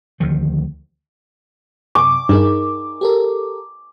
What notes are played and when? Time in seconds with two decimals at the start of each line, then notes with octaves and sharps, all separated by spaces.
0.20 D2 D#3 F3
1.95 F#2 C3 D6
2.29 G2 D#4 G#4 A#4
3.01 G4 A4 A#4